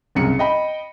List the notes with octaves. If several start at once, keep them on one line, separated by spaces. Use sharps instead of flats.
F#1 C2 C#7
D#5 G5 B5